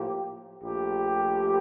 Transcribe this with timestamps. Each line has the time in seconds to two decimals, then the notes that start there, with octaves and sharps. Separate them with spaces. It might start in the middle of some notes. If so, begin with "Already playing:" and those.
Already playing: A2 F3 A#3 G4
0.63 A#1 A#2 A3 G4